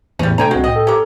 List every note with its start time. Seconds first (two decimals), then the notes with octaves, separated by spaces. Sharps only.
0.19 E2 A2 G3 C#4
0.38 C3 A3 D4 A4 G5 G#5 A#5
0.51 C2 B2 G#3 C4 F#4
0.64 A2 D#5 G5
0.76 A4
0.87 C#4 G4 A#4 D6